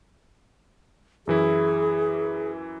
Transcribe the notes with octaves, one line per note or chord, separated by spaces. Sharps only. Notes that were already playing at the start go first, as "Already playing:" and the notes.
F#2 E3 E4 G#4